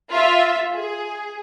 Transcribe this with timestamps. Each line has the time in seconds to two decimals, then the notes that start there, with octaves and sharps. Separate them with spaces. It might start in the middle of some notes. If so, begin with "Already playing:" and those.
0.12 F4 E5
0.75 G#4